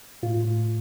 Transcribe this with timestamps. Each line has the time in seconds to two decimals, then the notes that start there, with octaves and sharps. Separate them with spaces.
0.23 A2 F4
0.45 A2